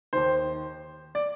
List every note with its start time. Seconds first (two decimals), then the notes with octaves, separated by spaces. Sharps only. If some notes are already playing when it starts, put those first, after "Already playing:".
0.13 D#2 D#3 C5
1.15 D5